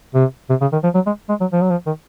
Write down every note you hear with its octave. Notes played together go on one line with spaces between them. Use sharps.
C3
C3
C#3
D#3
F3
F#3
G#3
G#3
F#3
F3
F#3
F3
D#3